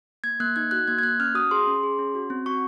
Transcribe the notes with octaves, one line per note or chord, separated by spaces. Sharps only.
A#3 G#6
A#3 F#6
D#4 G#6
F#4 F#6
A#3 G#6
G#6
A#3 F#6
C#4 F6
F#4 D#6
G#4 C6
C#4
G#4
C#4
F#4
C4
F#4 C#6